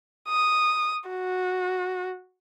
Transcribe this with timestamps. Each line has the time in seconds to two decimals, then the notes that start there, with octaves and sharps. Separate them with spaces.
0.29 D#6
1.10 F#4